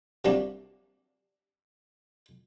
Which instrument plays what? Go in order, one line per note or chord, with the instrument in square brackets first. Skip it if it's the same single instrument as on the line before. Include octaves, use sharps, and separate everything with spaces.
[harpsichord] C3 G3 A#3 D4 F#4 G4